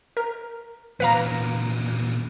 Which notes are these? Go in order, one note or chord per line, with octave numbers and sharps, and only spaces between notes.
A#4
E2 A#2 B4 F5 A#5